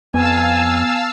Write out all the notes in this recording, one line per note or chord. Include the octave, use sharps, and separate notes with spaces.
F2 B3 F5 G#5 A5 E6